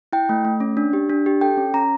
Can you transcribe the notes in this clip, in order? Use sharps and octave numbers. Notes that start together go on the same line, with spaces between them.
E4 G5
A3
A3
C#4
D4
G4
D4
G4
A4 G5
C#4
C#4 A#5